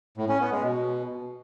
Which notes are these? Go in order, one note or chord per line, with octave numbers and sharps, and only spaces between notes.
A2
C#4
B3
G#3
B2